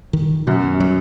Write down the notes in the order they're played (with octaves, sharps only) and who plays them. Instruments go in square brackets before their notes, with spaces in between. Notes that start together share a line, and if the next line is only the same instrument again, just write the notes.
[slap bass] D#3
[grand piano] F#2 [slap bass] B2
[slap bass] F#3